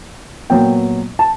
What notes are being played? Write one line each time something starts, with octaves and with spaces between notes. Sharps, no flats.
A#2 F#3 B3 G5
A5